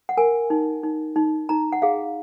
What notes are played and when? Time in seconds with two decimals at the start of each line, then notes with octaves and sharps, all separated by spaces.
0.09 F#5
0.17 A#4 G#5
0.50 D#4
0.83 D#4
1.16 D#4
1.49 D#4 A#5
1.72 F#5
1.82 G#4 F5